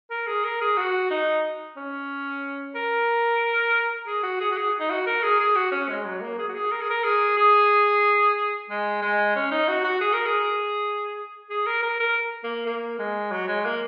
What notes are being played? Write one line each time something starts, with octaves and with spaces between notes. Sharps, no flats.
A#4
G#4
A#4
G#4
F#4
D#4
C#4
A#4
G#4
F#4
G#4
F#4
G#4
D#4
F#4
A#4
G#4
G#4
F#4
C#4
G#3
F#3
A#3
G#4
F#4
G#4
A#4
G#4
A#4
G#4
G#4
G#3
G#3
C#4
D#4
F#4
F#4
G#4
A#4
G#4
G#4
A#4
A#4
A#4
A#3
A#3
G#3
F#3
G#3
A#3